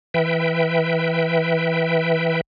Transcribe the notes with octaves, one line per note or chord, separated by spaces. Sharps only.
E3 B4 E5 G5